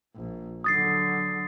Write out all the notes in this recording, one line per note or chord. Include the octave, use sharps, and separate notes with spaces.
A#1
D3 F#3 D#6 A6 C7